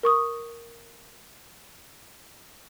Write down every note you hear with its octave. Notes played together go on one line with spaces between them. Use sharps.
A#4 C#6 D#6